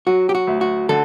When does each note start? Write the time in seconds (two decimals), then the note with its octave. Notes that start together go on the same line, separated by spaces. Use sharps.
0.06 F#3 F#4
0.29 G4
0.35 F#4
0.47 D2
0.61 F#4
0.89 D3 A4